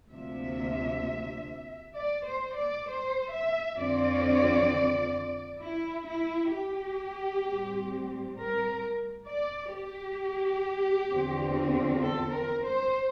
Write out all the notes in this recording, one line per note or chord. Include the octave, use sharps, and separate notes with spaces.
D2 C3 F3 A#3 D4 E5
D5
C5
D5
C5
E5
F2 D3 F3 C4 D5
E4
E4
G4
A2 G3 C4
A#4
D5
G4
E2 D3 F3 C4
A4
A#4
C5